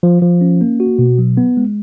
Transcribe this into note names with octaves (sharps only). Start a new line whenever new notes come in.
F3
F3
C#4
A#3
F#4
B2
F#3
B3
G#3